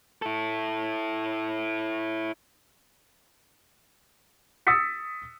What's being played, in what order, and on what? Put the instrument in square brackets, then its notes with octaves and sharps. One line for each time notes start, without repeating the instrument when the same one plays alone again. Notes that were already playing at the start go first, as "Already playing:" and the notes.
[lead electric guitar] E4 A4
[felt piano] D#6 E6 A6 B6 C#7